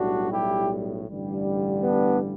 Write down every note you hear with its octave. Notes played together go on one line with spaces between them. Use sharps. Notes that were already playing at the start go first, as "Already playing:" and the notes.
Already playing: B1 A2 G3 D4 F#4
E4 G4
A1 G2 D3 G3
B3 D4